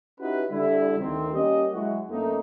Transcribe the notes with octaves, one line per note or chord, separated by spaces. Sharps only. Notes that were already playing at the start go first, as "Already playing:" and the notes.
C#4 D#4 E4 F#4 G4 B4
D3 G3 E4
D2 D#3 C4
G3 A#3 C#4 G4 D#5
F#3 G#3 E4 F#4
F#2 D3 A3 A#3 C#4 D#4